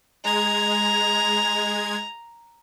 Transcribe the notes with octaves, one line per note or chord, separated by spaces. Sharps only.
G#3 A#5 G#6